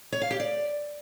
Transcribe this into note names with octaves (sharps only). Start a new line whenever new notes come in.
C#5
F5
G4
D5